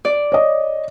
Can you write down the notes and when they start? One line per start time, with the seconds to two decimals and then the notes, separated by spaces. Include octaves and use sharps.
0.05 D5
0.32 C#5 D#5